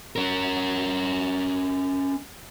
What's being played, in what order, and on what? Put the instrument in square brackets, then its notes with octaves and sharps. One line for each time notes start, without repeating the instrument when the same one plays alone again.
[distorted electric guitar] C#4 A#4